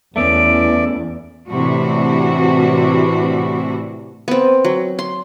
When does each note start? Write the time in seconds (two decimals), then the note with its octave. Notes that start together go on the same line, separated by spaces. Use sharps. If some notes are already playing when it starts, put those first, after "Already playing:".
0.16 E2 A3 B3 C#4 D5 E5 D7
1.49 A2 C3 E3 D4 F#4
4.28 B3 C4
4.65 F#3
4.99 C6